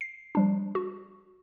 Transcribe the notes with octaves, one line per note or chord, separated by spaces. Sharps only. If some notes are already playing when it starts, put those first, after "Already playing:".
C7
F3 G3 D4
F#4